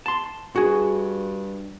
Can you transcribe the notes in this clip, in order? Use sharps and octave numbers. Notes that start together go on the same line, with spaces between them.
A5 C6
G2 F#4 G#4